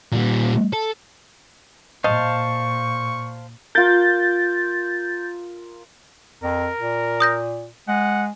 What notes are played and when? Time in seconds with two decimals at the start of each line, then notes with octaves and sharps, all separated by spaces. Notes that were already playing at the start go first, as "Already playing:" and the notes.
0.12 A#2 G3
0.73 A4
2.04 A#2 C5 D#5 F5 A5 C#6
3.75 F4 A#4 G6 A6
6.43 F2 A#4
6.80 A#2
7.20 D#6 G6 A#6
7.88 G#3 F#5